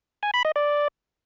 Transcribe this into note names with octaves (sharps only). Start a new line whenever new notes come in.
G#5
B5
D#5
D5